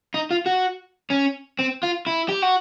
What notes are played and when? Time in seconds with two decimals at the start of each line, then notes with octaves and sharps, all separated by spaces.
0.14 D#4
0.31 F4
0.46 F#4
1.10 C#4
1.59 C4
1.83 F4
2.07 E4
2.29 G4
2.42 F#4